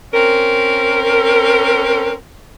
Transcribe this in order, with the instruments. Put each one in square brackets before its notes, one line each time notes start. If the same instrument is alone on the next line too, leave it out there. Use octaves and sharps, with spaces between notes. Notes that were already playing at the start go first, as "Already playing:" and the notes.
[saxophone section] C4 C#4 A#4